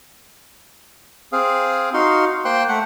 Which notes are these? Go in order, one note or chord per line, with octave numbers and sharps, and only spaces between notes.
C4 G#4 F5
D#4 F#4 F5 C6
A#3 C5 G5 C6 F#6
A3 F#5